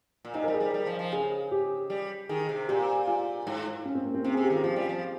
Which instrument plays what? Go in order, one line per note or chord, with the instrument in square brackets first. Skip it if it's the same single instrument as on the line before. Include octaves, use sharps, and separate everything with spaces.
[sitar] A#2
[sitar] C3 [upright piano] D#4
[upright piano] A#4
[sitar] G3
[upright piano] G#4
[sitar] G3 [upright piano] A#4
[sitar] G3
F3
F3
[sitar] C#3 [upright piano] G#4
[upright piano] G4
[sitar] G3
[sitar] D#3 [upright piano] G#4
[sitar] C3
[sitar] A#2 [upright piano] G4
[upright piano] F4
[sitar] G#2
[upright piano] C#4
C4
A#3
C4
[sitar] C3 [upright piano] C#4
[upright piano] G#4
[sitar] C3
[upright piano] G4
[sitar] D#3 [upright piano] F4
[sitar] F3 [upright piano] F4
[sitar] G3
F3